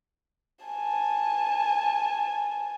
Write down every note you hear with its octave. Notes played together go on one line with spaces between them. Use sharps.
G#5 A5